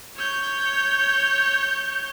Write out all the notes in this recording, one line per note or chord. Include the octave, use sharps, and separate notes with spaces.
C#5 G6